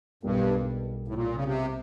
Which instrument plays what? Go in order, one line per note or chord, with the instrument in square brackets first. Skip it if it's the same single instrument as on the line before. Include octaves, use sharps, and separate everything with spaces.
[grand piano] B1 B2 G3 A#3 [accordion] G2
[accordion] A2
A#2
C#3
C3